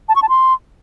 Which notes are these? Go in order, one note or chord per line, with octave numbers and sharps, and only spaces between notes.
A5
C#6
A5
C6